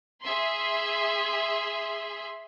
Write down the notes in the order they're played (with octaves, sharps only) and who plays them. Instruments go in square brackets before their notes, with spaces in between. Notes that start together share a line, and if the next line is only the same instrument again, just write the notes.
[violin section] G#4 E5 C6